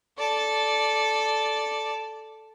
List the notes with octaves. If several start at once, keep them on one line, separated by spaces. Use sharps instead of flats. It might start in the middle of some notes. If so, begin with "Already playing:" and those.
A4 D5